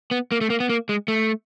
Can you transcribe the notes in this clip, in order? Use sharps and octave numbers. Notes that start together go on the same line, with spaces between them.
B3
A#3
A3
A#3
B3
A#3
G#3
A3